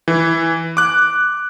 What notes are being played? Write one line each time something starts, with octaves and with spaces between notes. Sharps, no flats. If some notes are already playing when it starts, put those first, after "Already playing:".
E3
D6 F#6